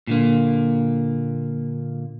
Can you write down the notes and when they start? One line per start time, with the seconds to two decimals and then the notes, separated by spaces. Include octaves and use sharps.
0.07 A#2 D3 A#3